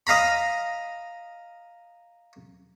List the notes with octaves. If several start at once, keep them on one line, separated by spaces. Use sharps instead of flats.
D#5 F5 A#5 B5